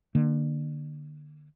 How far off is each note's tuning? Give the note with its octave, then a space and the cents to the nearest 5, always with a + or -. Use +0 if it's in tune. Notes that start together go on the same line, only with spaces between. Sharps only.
D3 +30 A#3 +10